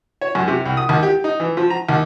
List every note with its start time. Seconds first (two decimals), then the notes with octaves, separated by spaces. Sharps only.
0.21 C#5
0.35 F#2
0.48 C3
0.65 C2
0.77 D#6
0.89 D#2
1.03 G4
1.24 D#4
1.40 E3
1.57 F3
1.70 A#5
1.89 D#2